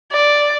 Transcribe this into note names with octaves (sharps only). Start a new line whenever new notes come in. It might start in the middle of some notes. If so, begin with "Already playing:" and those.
D5